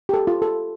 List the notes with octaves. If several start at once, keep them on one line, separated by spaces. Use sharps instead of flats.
G4
A4
F4
A4